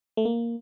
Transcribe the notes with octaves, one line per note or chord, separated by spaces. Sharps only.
A3
A#3